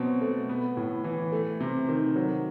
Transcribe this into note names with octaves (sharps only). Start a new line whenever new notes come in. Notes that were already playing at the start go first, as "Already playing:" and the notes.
Already playing: B2 F#3 C4
A3
B3
A2
E3
A3
C3
D#3
F#3